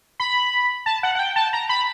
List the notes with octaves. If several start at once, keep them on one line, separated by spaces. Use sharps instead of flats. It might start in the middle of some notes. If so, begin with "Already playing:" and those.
B5
A5
F#5
F#5
G5
A5
A#5
B5